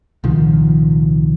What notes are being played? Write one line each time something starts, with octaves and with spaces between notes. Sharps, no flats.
C2 A#2 D#3 F3